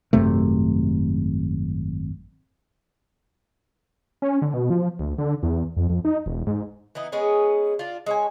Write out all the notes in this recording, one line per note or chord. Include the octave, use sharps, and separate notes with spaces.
G#1 F#2 C3 A3
C#4
D3
B2
F3
D2
D3
E2
F2
F2
D#4
E1
G#2
E3 B3 D#4
G#3 B3 C#4 G#4
D4 F4
G#3 C#5 G#5